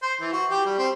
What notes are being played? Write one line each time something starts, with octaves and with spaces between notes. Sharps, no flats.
C5
E3
F#4
G4
G3
C4